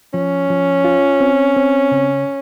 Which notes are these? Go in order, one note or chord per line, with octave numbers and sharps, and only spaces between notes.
F3 C#4
F3
F4
C4
C4
C#3